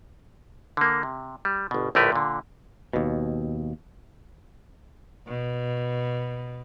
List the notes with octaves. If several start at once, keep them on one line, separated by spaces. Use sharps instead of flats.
D3 A#3
C3
G3
G1 B2
A#1 A2 D3 A3 A#4 B4
A#2 D3
D#2 B2
B2